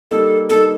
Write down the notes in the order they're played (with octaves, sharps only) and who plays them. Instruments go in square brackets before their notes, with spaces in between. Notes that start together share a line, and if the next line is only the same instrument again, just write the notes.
[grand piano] G3 A#3 D#4 [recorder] A4
[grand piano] G3 A#3 D#4 [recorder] A4